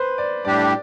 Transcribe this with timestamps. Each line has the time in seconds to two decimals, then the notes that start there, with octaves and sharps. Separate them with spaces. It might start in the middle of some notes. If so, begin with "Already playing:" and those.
Already playing: B4 C5
0.18 D5
0.45 A2 G3 D4 G4 D5